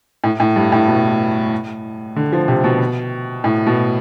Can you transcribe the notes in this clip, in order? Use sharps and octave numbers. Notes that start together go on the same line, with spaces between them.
A2
A2
G2
A2
B2
D3
F3
C3
B2
A2
B2